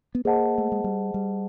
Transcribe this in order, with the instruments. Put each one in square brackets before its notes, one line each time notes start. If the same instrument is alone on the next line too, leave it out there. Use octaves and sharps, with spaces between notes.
[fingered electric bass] B3
[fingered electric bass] A#3 [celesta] G#4 C5 D#5 F#5 A5
[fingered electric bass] A3
G#3
G3
G3